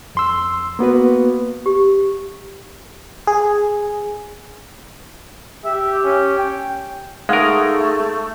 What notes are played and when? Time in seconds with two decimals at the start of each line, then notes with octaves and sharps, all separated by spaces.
0.15 F2 C6 E6
0.79 A#3 B3 F#4 B4
1.66 G4
3.27 G#4
5.65 G4 E5
6.04 C#4
6.38 G5
7.29 G#3 A3 D#4 G#4 A#4 F5 F#5 D#6